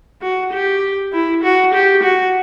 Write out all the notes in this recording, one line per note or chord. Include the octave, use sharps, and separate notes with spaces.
F#4
G4
E4
F#4
G4
F#4